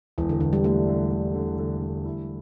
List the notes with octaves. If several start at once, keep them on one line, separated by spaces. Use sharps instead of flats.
E1 E3
D3
E1 D3
G3
D3 A3
D3
D3
D3
D3
D3
E4